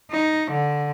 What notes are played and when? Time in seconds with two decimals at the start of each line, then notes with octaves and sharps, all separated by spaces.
0.11 D#4
0.52 D3